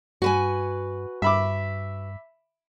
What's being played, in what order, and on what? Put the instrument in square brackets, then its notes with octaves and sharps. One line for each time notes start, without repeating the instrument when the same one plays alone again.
[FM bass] G2 [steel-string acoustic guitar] F#4 B4 G#5
[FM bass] G2 [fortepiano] E5 B5 D6